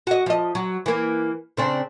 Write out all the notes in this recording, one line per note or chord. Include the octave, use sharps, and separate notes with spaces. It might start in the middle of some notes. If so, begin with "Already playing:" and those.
F#4 D#5
F3 D#5
F#3
E3 A#3
C#3 C4 D4